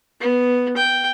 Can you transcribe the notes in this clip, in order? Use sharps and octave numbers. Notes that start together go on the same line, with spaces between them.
B3
G5